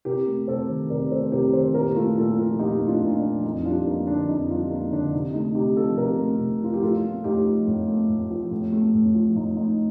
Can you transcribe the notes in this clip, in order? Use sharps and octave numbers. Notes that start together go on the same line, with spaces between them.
C3 G4 A#4
A3
C3 A4 C5
D#3
C3 A#4 D5
A3 A4 C5
C3 G4 A#4
D#3 A4 C5
A#2 G4 A#4
A3 F4 A4
A#2 F4 A4
F3 F4 A4
A#2 D#4 G4
A3
D4 F4
A#2
D#4
D4
F3
F2 D#4
G3 D4 F4
A#3 D#4
D3 D4
F2 D#4
G3 D4 F4
A#3 D#4
D3 D4
C3 D#4
A3 D#4
C3 D#4 G4
F3 F4 A4
C3 G4 A#4
A3
C3
F3 F4
G4
A2 F4 A4
A3
A2 D#4 G4
F3
A2
A3
A2
F3
A2
A3
A2
F3
A2 D#4
A3 D#4